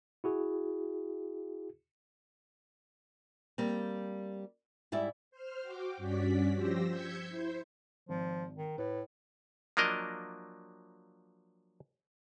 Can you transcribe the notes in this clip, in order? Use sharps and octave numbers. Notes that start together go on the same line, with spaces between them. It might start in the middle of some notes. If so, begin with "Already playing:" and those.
E4 F#4 G#4
G3 A#3 C4
G#2 G3 E4 D5 E5
C5 F6
F#4 G5 D6
G2 C#4 F#4 D5 B6
F3 G4 C5 E6 A#6
E6 G6 G#6 B6 C#7
E4 C5
G#1 F3
D#3
A2 B4
F3 F#3 A#3 D4 A#4 D#5